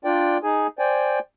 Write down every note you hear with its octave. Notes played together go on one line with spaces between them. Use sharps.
D4 F4 D5 G5
D#4 G#4 G#5
C5 D5 G5 G#5